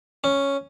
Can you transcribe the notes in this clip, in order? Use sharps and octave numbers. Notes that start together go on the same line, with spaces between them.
C#4